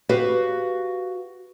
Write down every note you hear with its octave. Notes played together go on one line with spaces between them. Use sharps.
F#4 G4 B4 F5